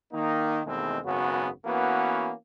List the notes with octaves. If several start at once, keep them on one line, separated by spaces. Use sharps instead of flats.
D#3 A#3 D#4
E2 B2 D#3 G#3 A3 C4
G#1 F#2 C#3 B3 F#4
E3 A#3 B3 C#4 F#4